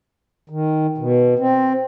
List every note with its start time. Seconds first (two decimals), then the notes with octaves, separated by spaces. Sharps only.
0.49 D#3
0.98 B2
1.39 C4